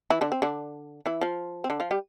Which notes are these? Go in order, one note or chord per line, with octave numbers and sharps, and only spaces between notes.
E3 E4
D3 D4
C4
D3 D4
E3 E4
F3 F4
C4
D3 D4
F3 F4
G3 G4